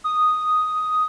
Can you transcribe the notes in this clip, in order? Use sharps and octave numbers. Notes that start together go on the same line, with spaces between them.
D#6